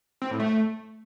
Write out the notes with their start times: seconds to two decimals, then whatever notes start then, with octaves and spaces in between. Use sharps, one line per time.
0.22 C4
0.31 A2
0.40 A3